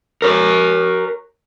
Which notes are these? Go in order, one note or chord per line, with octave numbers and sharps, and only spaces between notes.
A#4 C#5